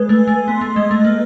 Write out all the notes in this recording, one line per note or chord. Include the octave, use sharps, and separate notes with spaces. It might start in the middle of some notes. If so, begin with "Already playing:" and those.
Already playing: G#3 B4
A3
G#5
A3
B3 C6
A3
G#3 D#5
A3
A#3 B4